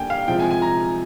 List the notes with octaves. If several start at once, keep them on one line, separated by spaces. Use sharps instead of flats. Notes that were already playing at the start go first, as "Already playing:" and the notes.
Already playing: D3 G3 A#3 G5 G#5
F5
C3 F3 G#3 G5
G#5
G#5
A#5